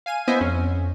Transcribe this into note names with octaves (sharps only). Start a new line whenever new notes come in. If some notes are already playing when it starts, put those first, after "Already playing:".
F5 G#5 D#7
B3 E4 C5 D#5 E5 G#5
F2 C#4